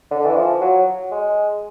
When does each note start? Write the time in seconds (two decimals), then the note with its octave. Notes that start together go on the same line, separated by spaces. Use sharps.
0.11 D3
0.25 E3
0.36 F3
0.61 F#3
1.11 G#3